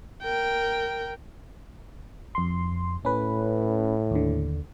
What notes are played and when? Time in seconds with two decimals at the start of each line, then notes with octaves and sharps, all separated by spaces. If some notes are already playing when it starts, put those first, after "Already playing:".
0.22 A#4 G5
2.35 F2 C6
3.05 A2 C#4 B4
4.11 D#2 D3